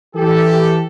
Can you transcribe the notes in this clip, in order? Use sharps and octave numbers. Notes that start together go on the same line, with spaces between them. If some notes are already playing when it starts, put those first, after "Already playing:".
E3 G4 A4